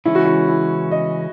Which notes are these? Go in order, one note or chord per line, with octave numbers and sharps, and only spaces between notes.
C#3 E3 G#3 C#4 E4
F#4
E4
E4
D#5